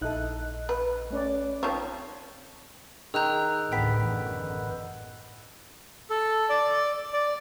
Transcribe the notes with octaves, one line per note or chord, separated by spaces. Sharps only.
A#1 D#4 E4 A4 D#5 F#6
B4
A3 C#4 D5
D#3 F3 C4 C#5
D#3 G#4 A#5 E6 F#6 G6
A1 D2 A2 B3 G5 B6
A1 F#2 D3
A4
D5
D5